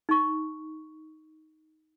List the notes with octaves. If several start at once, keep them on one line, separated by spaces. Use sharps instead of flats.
D#4 C#6